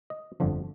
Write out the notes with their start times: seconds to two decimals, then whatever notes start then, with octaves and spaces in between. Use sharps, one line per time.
0.10 D#5
0.40 G1 F2 D3 F3